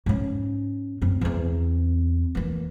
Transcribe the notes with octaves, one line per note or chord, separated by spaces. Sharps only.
G#2 C#4
F#2 C4
E2 C4
E3 A#3